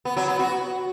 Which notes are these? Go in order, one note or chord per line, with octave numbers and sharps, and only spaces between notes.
B3
F#3
B3
F#4